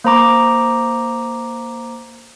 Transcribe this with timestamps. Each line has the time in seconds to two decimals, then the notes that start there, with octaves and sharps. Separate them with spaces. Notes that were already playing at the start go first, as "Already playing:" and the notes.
0.04 A#3 C5 A#5 D6